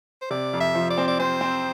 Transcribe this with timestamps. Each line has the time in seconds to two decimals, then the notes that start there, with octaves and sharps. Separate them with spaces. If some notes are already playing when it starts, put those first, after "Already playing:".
0.21 C5
0.30 C3 D5
0.53 F2
0.60 E5
0.75 F3
0.90 D5
0.98 C4
1.08 D5
1.19 C4 C5
1.41 C4